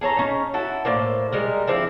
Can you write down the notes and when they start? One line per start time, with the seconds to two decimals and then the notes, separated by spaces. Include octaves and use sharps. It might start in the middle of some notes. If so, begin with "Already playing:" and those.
0.01 G#4 A4 C#5 A#5
0.17 C#4 D#4
0.54 E4 F#4 A4
0.85 A2 A#3 C5 D5
1.32 G3 G#3 A#4
1.67 F3 C4 D4 E4